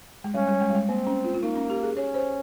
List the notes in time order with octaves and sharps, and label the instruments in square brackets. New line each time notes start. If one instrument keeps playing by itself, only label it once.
[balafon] G#3
[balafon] G3 [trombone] C#4
[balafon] G3
G#3
G3
G#3
[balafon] A#3 [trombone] C4
[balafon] C#4
F4
F4
[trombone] A#3 [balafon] D#4
[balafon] C#4
G4
G#4
[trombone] C#4 [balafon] C#5
[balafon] C5